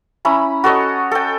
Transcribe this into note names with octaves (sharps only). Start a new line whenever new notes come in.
C#4 E4 A#5 B5
F#4 A4 C#5 D#5
A4 G5